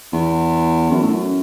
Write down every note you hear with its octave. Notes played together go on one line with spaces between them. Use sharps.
E2
F#2
A2
F#2